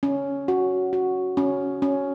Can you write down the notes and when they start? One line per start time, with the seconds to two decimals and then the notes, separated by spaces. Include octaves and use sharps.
0.03 C#4
0.48 F#4
0.93 F#4
1.37 C#4
1.82 C#4